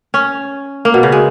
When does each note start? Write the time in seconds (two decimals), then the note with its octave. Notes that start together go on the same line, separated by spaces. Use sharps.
0.14 C#4
0.85 A#3
0.94 B2
1.03 C#3
1.12 G#3